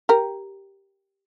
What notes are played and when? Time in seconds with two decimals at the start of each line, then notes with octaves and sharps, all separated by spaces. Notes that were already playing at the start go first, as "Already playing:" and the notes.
0.09 G4 A#4